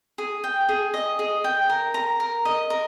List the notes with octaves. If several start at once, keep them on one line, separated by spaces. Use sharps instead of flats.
G#4
G5
G#4
D#5
G#4
G5
A#4
A#5
A#4
D#5
A#4